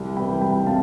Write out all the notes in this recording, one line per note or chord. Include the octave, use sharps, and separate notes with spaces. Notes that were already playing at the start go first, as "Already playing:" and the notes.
Already playing: C2
C3 E3 G5 B5
C2 G5 B5
C3 F5 A5